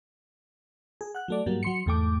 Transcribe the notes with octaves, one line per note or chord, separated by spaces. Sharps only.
G#4
F#5 F#6
F#3 A3 D5
G#2 F#3 G3 A#3
F#3 C6 C#7
E2 G#2 A3 G5 D6